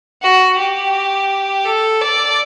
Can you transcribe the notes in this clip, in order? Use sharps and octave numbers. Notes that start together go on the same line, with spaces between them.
F#4
G4
A4
D5